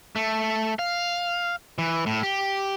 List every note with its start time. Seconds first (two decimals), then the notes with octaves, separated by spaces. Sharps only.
0.16 A3
0.79 F5
1.78 E3
2.06 A2
2.23 G4